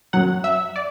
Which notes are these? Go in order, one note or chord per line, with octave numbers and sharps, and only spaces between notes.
F#2 F#3 F#5
E5
D5